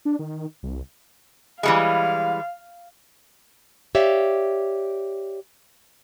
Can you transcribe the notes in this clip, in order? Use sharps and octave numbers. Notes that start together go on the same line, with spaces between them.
D4
D#3
C2
E3 G3 G#3 F5
G4 C#5 D5 E5 F5 G5